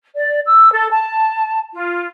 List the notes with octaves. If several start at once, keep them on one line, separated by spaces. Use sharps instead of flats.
D5
E6
A4
A5
F4